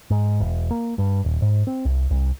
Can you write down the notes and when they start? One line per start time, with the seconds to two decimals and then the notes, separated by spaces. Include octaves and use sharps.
0.11 G#2
0.40 E1
0.71 A#3
0.98 G2
1.24 D#1
1.42 G#2
1.67 C4
1.85 C2
2.11 C2